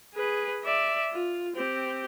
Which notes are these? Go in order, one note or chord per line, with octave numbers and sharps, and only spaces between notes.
G#4 B4
D5 E5
F4
C4 G4